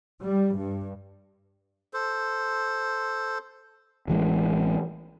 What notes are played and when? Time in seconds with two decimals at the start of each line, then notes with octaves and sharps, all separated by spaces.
0.23 G3
0.56 G2
1.93 A4 C5
4.08 A1 E3 F#3 G#3